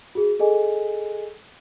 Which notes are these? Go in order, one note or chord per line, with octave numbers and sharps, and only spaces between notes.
F#4 G#4
G#4 A4 D#5 G#5